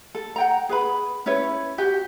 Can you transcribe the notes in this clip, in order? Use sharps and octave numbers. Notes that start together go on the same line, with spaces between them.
A4
F#5 G5 A#5
G#4 B4 B5
C#4 E4 B4 C#5
F#4 G4 G5